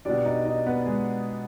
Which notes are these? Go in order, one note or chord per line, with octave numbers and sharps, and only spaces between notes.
B2 G3 D4 D5
D#4 D#5
D#4 D#5
B3 B4
G#3 G#4